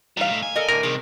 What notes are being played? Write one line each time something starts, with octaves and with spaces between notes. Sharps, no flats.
D#3 E3 G3 F5
A2 A3
G#5
A4 A#4 D#5
A2 D3 A#4
C2 C3 D#3 G#3